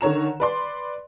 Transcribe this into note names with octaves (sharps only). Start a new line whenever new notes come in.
D3 D#3 C#5 A#5 E7
B4 D5 C6